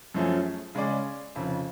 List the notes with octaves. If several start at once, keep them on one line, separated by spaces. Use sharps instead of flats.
F#2 F3 A3 C#4 G#4
C#3 G#3 C#4 G#4 D5
F1 F2 C#3